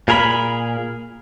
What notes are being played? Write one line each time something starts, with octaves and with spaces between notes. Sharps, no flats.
A#2 G#4 A#4 A#5 B5